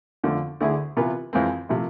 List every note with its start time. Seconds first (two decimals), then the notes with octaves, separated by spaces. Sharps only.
0.24 F2 D3 F3 A3
0.61 D2 D3 A3 E4 G#4
0.97 C3 E3 B3 F4 B4
1.33 F2 E3 G#3 C4
1.69 C3 F3 A3 E4